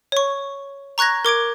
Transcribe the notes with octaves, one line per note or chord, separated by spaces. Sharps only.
C#5 C#6
A#5 C#6 F#6 G#6 A#6
A#4 D6 G#6 D7